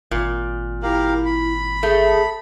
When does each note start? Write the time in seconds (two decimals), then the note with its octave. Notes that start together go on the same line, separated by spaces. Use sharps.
0.11 G#1 A#2
0.83 E4 G4 A#4 F5
1.25 B5
1.83 A3 G#4